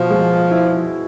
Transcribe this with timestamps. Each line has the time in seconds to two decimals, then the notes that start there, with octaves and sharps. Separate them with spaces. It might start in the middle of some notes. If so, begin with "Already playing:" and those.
Already playing: B2 F3
0.10 G#3
0.51 E4